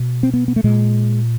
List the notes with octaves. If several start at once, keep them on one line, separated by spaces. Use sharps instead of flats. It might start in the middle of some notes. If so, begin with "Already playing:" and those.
Already playing: B2
C4
B3
B3
A3
A#2 G#3